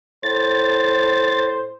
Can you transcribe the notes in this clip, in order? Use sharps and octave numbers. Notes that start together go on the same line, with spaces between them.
A2 C5 A6